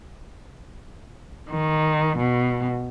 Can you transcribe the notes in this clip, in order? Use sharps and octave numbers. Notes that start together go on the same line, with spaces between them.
D#3
B2